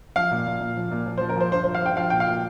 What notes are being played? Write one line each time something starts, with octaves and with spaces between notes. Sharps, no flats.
F3 F5
A#2
A#2
A#2
F3
A#2
F3
C5
F3
A#4
F3 C5
G2 C5
F3 C5
F5
G2 G5
F3 F5
A#2 G5
F5
A#2